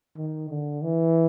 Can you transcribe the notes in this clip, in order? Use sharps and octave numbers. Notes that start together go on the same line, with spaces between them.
D#3
D3
E3